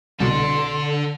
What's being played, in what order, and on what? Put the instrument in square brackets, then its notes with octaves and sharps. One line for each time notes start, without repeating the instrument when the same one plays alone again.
[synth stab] C2 B2 [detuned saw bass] D3 [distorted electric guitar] A4 D5 [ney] C6